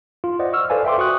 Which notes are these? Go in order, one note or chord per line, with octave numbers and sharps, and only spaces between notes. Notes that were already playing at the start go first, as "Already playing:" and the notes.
F4
C5 D5 D#5 F#5
C#6 E6 F6
A4 B4 C5 D5 F5 G#5
E5 G5 C6 D6
F#4 C#6 D#6 F#6